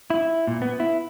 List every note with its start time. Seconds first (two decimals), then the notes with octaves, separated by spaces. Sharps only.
0.10 E4
0.47 A#2
0.62 B3
0.80 E4